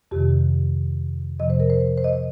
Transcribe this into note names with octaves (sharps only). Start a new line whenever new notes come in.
F2 C3 D#3 G4
F2 C3 F3 D#5
C5
A#4
C5
C5
D#5